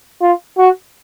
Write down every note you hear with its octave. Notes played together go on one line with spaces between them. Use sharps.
F4
F#4